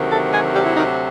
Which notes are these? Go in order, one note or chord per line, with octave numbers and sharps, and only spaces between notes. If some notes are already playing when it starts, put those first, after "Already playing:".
Already playing: D2 C3 D#3 F#3
A3 A4
G#3 G#4
G3 G4
E4
D#3 D#4